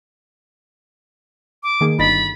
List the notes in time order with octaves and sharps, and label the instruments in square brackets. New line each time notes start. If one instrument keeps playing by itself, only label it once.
[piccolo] D6
[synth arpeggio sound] D#3 A#3 G#4
[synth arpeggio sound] G1 D#4 A6 [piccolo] B5